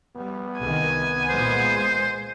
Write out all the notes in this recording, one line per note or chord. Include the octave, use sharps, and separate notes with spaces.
G3 B3
C2 D#3 G#5
A#2 G#3 C5